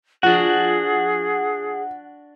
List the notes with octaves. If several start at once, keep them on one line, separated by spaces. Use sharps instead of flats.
F3 D4 F#4 G#4 F#5